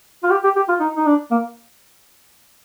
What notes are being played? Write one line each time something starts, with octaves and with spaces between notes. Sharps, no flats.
F4
G4
G4
G4
F4
D#4
D#4
D4
A#3